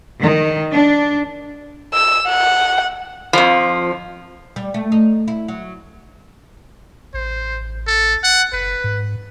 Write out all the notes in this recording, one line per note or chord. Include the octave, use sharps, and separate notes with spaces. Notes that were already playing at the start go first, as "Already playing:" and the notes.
D#3
D4
E6
F#5
F2 F3
G3
A3
D#4
E4
F#3
A1 C5
A4
F#5
F#1 B4
G#2